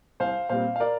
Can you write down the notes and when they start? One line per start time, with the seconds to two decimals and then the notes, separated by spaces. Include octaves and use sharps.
0.20 C2 C5 F5
0.49 A#2 G3 C4 C5 F5
0.76 F5
0.80 A#4 D5